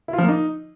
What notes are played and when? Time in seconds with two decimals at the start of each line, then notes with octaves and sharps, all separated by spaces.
0.08 E4
0.13 F4
0.18 F3
0.23 A#3
0.29 D#4